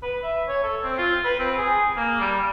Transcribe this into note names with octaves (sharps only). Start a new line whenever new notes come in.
B4
E5
C#5
A4
C4
F4
B4
C4
G#4
A#3
G3